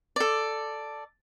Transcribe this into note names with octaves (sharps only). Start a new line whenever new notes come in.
A4 D5